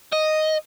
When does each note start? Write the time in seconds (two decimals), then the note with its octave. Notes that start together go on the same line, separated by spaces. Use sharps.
0.12 D#5